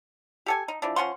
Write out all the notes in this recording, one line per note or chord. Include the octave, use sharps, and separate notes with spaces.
G4 A4 G#5
D#4
E3 F3 D4
F3 C#4 F#5 C6